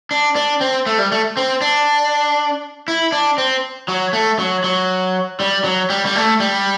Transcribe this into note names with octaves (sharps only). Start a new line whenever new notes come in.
D4
D4
C4
A3
G3
A3
C4
D4
E4
D4
C4
F#3
A3
F#3
F#3
G3
F#3
G3
G3
A3
G3